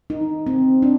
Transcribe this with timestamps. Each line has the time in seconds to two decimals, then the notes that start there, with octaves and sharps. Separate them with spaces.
0.10 D#4
0.46 C4
0.82 D4